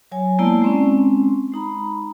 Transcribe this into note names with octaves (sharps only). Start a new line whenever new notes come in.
F#3 C#5 G#5
G#3 A#3 B3 E4 D5 A5
G#3 C4 C#4
G#3 D#4 A#5 B5